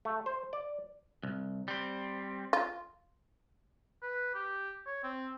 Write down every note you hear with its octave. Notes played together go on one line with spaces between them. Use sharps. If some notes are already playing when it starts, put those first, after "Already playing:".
A3
C5
D5
C2
G3 C4
F4
B4
G4
C#5
C4